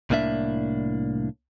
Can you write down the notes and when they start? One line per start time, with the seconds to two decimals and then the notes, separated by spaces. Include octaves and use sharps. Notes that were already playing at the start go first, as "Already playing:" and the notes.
0.10 C2 A2 A#3 D4 E5